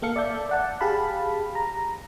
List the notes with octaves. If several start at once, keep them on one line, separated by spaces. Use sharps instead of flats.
A#3 A4 F5 C#7
D5 E5 A5 G6
D5 F#5 A5
G4 G#4 F5 A5 B5
A#5